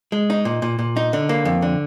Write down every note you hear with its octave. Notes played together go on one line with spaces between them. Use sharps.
G#3
D#4
A#2
A#2
A#2
D#4
D3
A#3
F2
D3